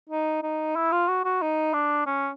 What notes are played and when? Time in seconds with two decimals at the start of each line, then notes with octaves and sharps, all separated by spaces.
0.10 D#4
0.43 D#4
0.76 E4
0.92 F4
1.08 F#4
1.25 F#4
1.42 D#4
1.74 D4
2.06 C#4